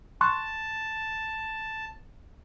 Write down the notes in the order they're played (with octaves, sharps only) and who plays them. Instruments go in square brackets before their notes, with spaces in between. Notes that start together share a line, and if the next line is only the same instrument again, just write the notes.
[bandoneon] A5 [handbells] C6 C#6 F#6